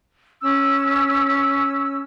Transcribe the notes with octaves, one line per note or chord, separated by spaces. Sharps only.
C#4 E6